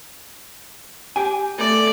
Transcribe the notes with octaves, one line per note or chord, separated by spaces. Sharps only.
G4 G5 G#5
A3 A4 D5